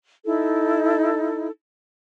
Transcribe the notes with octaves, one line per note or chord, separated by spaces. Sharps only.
D#4 E4 A4